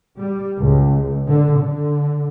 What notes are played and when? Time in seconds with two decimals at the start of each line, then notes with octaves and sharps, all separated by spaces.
0.16 G3
0.59 C#2
1.28 D3
1.60 D3